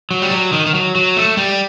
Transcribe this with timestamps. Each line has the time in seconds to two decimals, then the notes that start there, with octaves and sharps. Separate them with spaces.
0.11 F#3
0.22 G3
0.31 F#3
0.53 D#3
0.66 D#3
0.74 F#3
0.96 F#3
1.16 A3
1.37 G3